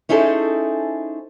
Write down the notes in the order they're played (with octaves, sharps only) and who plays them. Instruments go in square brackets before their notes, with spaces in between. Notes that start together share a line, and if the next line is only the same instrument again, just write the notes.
[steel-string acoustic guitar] C#4 D#4 E4 G#4 A4 C5